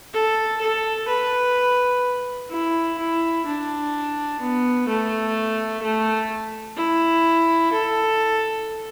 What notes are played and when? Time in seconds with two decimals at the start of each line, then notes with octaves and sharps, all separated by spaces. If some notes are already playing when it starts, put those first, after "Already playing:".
0.14 A4
0.61 A4
1.08 B4
2.50 E4
2.98 E4
3.46 D4
4.40 B3
4.88 A3
5.83 A3
6.77 E4
7.72 A4